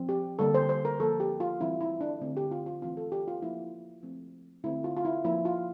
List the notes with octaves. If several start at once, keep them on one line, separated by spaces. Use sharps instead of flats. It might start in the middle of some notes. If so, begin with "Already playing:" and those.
Already playing: F3 C4
G4
D3 G3 A#3 A4
C5
C5
A#4
F3 A#3 A4
G4
F4
E3 G3 C4 E4
E4
D4
D3 A3 C4
G4
F4
F4
E3 A3 C4 F4
A4
G4
F4
F3 A#3 E4
F3 A3 C4
D3 A3 C4 E4
F4
F4
E4
F3 A#3 E4
F4